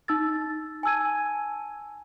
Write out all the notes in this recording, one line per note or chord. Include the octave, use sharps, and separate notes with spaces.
D#4 E6 A6
G#5 A5 E6 G#6 D#7